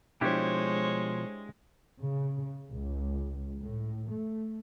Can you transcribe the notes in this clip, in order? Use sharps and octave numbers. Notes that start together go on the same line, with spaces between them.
B2 F3 G#3 D4 E4 G4 C5 C#5
C#3
C#2
A2
A3